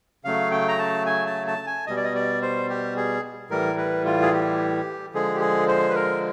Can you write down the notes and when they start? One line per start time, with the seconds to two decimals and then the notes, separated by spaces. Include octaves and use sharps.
0.24 C#3 F#3 A3 F5
0.51 G5
0.69 A#5
0.79 A5
1.06 G#5
1.26 A5
1.47 A5
1.67 G#5
1.87 B2 G3 D#5
1.97 D5
2.05 D#5
2.15 D5
2.42 C5
2.70 G4
2.97 G#4
3.50 A2 E3 G3 A#4
3.78 B4
4.05 F4
4.22 G#4
4.33 G4
5.14 D3 F3 G#3 G#4
5.35 G4
5.41 G#4
5.68 C5
5.90 B4
5.95 A#4